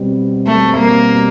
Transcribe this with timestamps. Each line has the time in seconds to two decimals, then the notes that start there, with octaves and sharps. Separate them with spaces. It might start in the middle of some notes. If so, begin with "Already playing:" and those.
Already playing: B2 G3 C4
0.47 A3
0.78 A#3